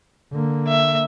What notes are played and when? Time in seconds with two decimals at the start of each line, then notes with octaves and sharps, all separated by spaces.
0.32 D3 A#3
0.68 E5